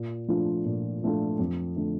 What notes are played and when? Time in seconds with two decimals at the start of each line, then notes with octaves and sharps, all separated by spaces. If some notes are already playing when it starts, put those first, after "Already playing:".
Already playing: A#2
0.28 F3 A3 D4 F4
0.65 A#2
1.02 F3 A3 D4 F4
1.39 F2
1.76 D3 A3